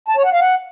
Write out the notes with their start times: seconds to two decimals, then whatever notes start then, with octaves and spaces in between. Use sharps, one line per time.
0.08 A5
0.16 C#5
0.25 F#5
0.33 F5
0.41 F#5